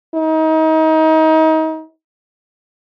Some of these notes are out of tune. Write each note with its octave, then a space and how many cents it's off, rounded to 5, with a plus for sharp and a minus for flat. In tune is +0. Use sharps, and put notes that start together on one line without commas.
D#4 +30